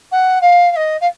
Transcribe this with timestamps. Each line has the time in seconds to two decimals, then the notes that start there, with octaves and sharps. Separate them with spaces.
0.12 F#5
0.41 F5
0.71 F5
0.76 D#5
1.01 F5